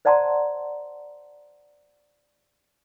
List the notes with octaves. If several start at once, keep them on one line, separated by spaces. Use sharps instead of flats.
C5 D5 F#5 A5 A#5 C6